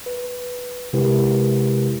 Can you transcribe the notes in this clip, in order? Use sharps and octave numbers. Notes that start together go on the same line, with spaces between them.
B4
C3 G#3 E4 G4 A#4 B4